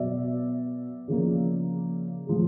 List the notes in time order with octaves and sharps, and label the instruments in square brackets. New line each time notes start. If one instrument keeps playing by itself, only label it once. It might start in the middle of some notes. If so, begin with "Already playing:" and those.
Already playing: [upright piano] B2 F#3 B3 D5 E5
C#3 F3 A#3
A2 F3 G#3